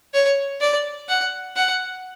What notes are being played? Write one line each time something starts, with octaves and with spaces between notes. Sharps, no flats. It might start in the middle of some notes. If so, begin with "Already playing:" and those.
C#5
D5
F#5
F#5